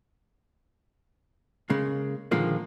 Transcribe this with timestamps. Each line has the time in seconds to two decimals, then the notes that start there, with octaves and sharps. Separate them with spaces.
1.70 C#3 G#3 A#3
2.31 A#2 D3 D#3 F3 G#3 A#3